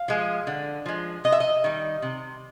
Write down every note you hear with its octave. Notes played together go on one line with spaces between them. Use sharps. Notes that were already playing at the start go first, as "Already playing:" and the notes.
Already playing: F5
F3 G#3
D3
F3 G#3
C3 D#5
E5
D#5
D#3 G3
C3